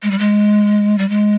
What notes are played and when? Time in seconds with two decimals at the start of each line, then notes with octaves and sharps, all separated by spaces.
0.03 G#3
0.11 G3
0.19 G#3
0.98 G3
1.09 G#3